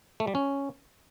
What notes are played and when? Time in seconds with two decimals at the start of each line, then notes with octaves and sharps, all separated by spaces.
0.20 A3
0.27 G3
0.35 C#4